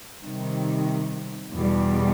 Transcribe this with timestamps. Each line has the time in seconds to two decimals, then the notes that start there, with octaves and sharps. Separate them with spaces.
0.22 C3 D#3 G3
1.52 E2 B2 G3